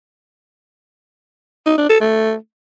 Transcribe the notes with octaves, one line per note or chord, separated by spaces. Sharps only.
D#4
D4
A4
A3